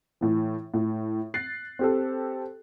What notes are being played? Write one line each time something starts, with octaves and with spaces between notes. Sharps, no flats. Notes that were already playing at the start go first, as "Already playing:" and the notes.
A2 E3
A2
F#6 A6 C7
C4 G4 A4